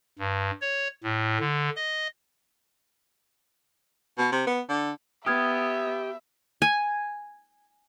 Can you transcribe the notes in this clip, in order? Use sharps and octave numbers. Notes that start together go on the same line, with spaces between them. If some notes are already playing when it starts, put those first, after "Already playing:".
G2
C#5
A2
D3
D#5
B2
C3
B3
D3
B3 G4 E5 D#6 F6 G#6
G#5